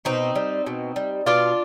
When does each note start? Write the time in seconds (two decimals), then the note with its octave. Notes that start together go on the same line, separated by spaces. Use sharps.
0.05 B2 C4 D#4
0.36 G3
0.67 B2
0.96 G3
1.26 B2 D4 F4